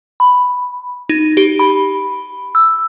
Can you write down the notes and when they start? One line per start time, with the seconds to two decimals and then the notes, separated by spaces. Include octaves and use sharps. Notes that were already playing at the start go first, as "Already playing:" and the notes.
0.20 B5
1.09 D#4
1.37 G4
1.59 B5
2.55 E6